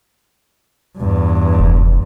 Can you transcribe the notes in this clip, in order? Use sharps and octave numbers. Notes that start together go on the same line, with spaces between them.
E2 G2
F1